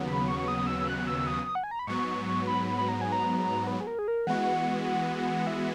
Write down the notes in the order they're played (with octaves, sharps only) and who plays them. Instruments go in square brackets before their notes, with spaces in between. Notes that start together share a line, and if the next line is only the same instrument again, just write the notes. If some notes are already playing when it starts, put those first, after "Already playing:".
Already playing: [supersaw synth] D#2 C#3 F#3 B3
[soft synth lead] B5
C#6
C#6
D#6
E6
F#6
E6
D#6
F#5
G#5
A#5
B5
[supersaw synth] G#2 F#3 B3 [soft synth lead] C#6
[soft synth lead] B5
B5
A#5
G#5
A#5
B4
G#4
A#4
G#4
A#4
[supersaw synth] E3 G#3 B3 F#4 [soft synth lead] F#5
[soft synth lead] E5